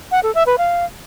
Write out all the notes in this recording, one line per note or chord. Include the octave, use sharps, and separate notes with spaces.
F#5
A4
E5
B4
F5